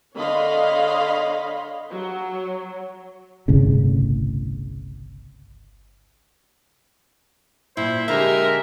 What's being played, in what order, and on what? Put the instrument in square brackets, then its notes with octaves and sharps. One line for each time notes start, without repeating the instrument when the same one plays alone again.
[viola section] D3 C#5 D#5 F5 B5 C6
F#3
[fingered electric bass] G1 C2 A2 C#3
[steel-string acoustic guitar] A#2 [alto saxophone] E4 [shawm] C5
[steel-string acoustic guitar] D3 F5 A#5 [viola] G#3 G4 [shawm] A#4 [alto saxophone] E5